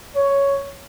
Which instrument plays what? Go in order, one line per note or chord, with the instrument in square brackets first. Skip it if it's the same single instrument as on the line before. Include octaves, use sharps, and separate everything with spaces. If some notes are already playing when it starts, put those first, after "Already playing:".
[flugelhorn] C#5